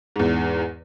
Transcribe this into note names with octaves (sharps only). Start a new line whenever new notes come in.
E2 G#2